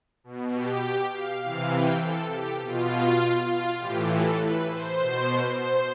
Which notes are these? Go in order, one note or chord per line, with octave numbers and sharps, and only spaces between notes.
B2
G4
F5
C3 E3 F5
G5
A4
G4
B2 F4
F4
A2 E3 G4
A4
B4
C5
B2
C5